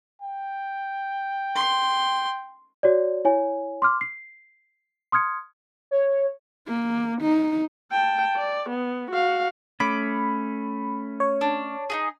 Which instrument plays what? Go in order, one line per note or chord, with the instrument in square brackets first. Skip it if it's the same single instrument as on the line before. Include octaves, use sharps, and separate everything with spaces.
[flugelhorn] G5
[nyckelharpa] C6
[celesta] F#4 C#5 D5
E4 C#5 G#5
C6 D6 F6
C7
C6 D#6 F6 G#6 C#7
[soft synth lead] C#5
[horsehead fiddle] A#3
D#4
[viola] G5 A5
D5
B3
F#4 F5
[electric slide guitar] A3 C#4 [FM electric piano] B5 [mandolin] D6
[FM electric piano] C#5
[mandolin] D4
D#4 F#4 G#4